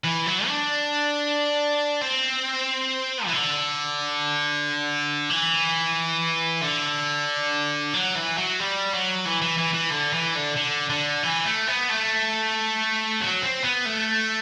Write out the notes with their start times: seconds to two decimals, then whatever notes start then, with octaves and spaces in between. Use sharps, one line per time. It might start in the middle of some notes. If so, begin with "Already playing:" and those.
0.04 E3
0.26 F#3
0.47 D4
2.02 C4
3.27 E3
3.33 D3
5.30 E3
6.62 D3
7.94 F#3
8.15 E3
8.37 F#3
8.60 G3
8.93 F#3
9.25 E3
9.42 E3
9.59 E3
9.74 E3
9.91 D3
10.13 E3
10.36 D3
10.57 D3
10.90 D3
11.23 E3
11.45 A3
11.67 B3
11.89 A3
13.21 F#3
13.43 C4
13.64 B3
13.86 A3